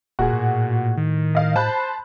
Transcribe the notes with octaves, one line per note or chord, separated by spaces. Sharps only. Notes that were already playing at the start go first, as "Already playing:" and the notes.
D1 A#2 F#4 G#4
A2
D#3
D#5 F5
C5 A5 B5 F#6